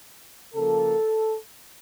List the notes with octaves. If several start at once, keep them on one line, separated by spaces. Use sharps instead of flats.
C#3 F3 A#3 A4